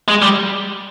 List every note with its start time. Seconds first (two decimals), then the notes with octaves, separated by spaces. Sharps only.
0.08 G#3
0.22 G3